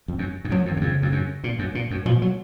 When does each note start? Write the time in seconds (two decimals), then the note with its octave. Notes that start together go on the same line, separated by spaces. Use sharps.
0.08 F2
0.19 F#2
0.45 G#2
0.50 F#2 F#3
0.62 F2 F3
0.71 D#3
0.77 F#2
0.81 F2 C#3
1.02 F2
1.12 F#2
1.44 A#2
1.59 F#2
1.75 A#2
1.91 F#2
2.06 B2 F3
2.22 F#3